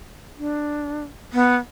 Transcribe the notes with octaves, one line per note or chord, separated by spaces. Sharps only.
D4
B3